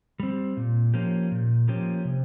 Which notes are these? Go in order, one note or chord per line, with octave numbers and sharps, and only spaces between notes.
G3 C4
A#2
F3 A#3 C#4 G4
A#2
F3 A#3 C#4 G4
C3